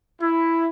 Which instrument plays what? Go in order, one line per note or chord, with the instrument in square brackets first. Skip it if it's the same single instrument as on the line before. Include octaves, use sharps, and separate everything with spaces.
[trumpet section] E4